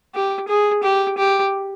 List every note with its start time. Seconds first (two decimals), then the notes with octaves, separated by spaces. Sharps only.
0.14 G4
0.48 G#4
0.83 G4
1.18 G4